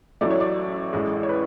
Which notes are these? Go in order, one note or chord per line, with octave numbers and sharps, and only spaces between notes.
A1 A2 F#3 A3 D5
C#5
D5
A1 A2 G#3
C#5
B4